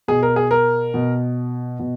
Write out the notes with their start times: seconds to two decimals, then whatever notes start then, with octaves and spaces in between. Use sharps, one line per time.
0.08 B2 G#4
0.23 A#4
0.36 G#4
0.51 A#4
0.94 B2
1.79 B2